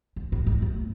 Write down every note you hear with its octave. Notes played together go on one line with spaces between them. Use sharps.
G#2
A2
G#2
A2